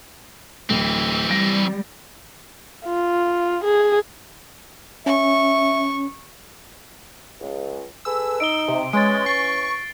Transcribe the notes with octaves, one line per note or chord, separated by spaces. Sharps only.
D1 E3 C4
G3 A#6 D7
F4
G#4
C#4 E5 C#6
C#2
G#4 A4 B4 E6
D#4 D7 G7
C3
E3 G#3 C#4 A6 D7
C#6 A6 C7